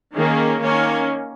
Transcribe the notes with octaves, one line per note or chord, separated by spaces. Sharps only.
D#3 A#3 C#4 D#4 G#4
D#3 A#3 C#4 C#5 F5